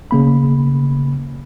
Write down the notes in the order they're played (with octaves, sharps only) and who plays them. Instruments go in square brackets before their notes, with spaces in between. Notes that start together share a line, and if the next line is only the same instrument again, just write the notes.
[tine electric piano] C#3 A#3 B5